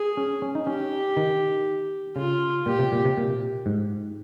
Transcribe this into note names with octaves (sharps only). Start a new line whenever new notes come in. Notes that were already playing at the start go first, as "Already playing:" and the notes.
Already playing: G#4
C#4
C#4
D#4
C#4 G4
D#3
C#3 F4
A#2 G4
C3
A#2
C3
A#2
G#2